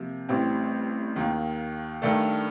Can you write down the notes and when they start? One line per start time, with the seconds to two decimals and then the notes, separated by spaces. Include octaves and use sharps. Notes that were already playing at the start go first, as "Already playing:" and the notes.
Already playing: C3 F3 A#3
0.29 A1 A2 G3 C4 G4
1.16 D#2 D#3 A#3
2.02 G2 D#3 A3 D4 A4